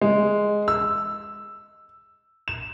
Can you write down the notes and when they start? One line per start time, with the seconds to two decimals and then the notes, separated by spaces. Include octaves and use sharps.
0.01 G#3
0.68 E6
2.48 E7